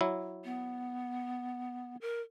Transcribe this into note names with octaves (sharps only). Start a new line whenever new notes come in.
F#3 E4
B3
A#4